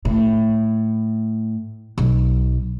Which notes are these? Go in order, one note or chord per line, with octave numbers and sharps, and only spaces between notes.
A2
B1